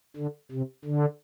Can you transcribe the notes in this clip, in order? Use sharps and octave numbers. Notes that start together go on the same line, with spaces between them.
D3
C3
D3